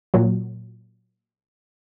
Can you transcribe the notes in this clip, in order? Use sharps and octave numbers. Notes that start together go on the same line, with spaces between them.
A#2 F#3